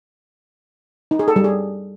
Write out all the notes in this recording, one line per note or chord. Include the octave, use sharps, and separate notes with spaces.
D#4
G#4
A4
G3
G#4